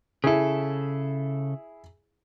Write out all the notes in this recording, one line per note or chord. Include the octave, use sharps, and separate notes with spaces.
C#3 E4 G#4 A4